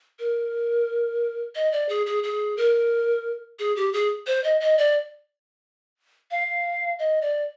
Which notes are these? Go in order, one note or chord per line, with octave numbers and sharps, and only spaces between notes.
A#4
D#5
D5
G#4
G#4
G#4
A#4
G#4
G4
G#4
C5
D#5
D#5
D5
F5
D#5
D5